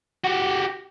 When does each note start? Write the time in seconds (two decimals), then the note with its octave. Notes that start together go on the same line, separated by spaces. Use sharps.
0.24 F#4 G4